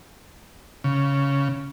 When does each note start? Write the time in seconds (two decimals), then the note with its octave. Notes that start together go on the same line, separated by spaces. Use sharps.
0.84 C#3